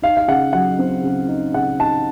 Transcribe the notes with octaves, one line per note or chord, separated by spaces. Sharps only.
D#4 F5
F5
C#3 F#5
F#3 F#5
C4
C#3
D#4
C#3 F#5
D#4 A5